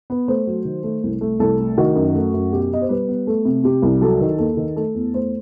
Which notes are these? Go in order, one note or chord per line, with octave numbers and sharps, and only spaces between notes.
B3
A3 C5
F#3
D#3
A3
C2
A3
C2 A4
A3
D#3 F#4
F#2
A3
F#2
B2 G4
B2 D#5
C5
G3 B4
B3
A3 A4
C3
C3 G4
C2
F#3 A4
D#3
D#2 A4
D#3
A3 A4
E2
A3 C5